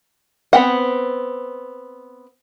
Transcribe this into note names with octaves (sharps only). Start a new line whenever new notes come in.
B3 C4 F#5